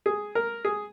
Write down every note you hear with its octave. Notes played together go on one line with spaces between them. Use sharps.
G#4
A#4
G#4